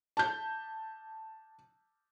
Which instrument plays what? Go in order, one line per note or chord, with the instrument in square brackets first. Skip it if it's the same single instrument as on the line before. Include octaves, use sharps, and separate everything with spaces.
[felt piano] A5 G6